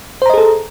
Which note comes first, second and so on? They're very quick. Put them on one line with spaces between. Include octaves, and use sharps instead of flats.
C5 A#5 D#5 G#4 A4